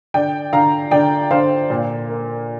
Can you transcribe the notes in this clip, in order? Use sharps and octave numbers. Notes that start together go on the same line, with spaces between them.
D3 D5 G5
D3 F5 A#5
D3 D5 G5
D3 C5 F5
A#2
A#3